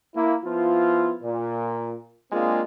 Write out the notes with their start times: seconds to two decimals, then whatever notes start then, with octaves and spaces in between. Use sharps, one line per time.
0.14 A#3 E4
0.43 F3 B3 E4 F4
1.22 A#2
2.31 G#3 A#3 C4 D4 F4 G#4